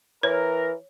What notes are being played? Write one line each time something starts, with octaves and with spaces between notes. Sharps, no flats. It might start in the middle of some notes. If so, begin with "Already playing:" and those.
E3 A#4 C#5